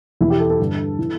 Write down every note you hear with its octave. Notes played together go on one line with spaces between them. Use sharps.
E2 B2 E4
G4
A4
A4
G2 D3
E3